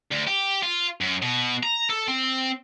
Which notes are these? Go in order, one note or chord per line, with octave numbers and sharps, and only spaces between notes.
D2
G4
F4
F#2
B2
A#5
A4
C4